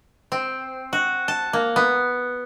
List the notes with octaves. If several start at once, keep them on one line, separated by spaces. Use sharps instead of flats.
C4
F#4
A5
A#3
B3